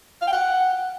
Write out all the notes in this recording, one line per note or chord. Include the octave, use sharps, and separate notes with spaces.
F5
G5
F#5